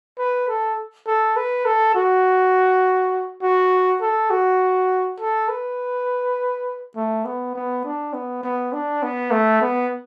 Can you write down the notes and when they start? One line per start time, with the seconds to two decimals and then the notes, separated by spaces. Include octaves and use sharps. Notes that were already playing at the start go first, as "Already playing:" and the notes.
0.18 B4
0.48 A4
1.07 A4
1.36 B4
1.65 A4
1.95 F#4
3.43 F#4
4.01 A4
4.30 F#4
5.20 A4
5.49 B4
6.96 A3
7.25 B3
7.55 B3
7.85 D4
8.13 B3
8.44 B3
8.73 D4
9.03 B3
9.31 A3
9.62 B3